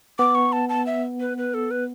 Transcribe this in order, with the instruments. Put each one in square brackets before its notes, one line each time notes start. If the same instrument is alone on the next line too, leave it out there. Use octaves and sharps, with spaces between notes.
[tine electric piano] B3 [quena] D6
[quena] C#6
A5
A5
E5
B4
B4
A4
B4